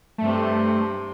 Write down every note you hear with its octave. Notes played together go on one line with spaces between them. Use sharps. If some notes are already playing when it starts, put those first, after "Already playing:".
G2 C3 A3